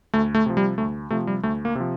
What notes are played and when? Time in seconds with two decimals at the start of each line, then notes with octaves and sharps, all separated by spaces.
0.14 D2 A3
0.35 A3
0.46 C3 F3
0.57 G3
0.78 D2 A3
1.10 C3 F3 A3
1.27 G3
1.43 D2 A3
1.65 A#3
1.75 C3
1.80 F3